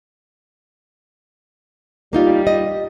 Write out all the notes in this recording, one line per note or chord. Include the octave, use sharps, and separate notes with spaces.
G3 A#3 D#4 F4
D#5